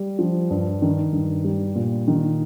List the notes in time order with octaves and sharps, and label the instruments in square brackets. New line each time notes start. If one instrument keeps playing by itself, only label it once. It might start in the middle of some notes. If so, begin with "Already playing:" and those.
Already playing: [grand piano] G3
F3
G2
D#3
G2
G3
A#2
D#3